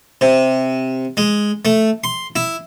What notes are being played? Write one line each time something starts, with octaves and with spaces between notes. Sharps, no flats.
C3
G#3
A3
C6
E4